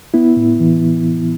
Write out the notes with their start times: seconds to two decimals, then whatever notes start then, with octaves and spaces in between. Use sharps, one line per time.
0.14 B3 E4
0.37 A2
0.60 E3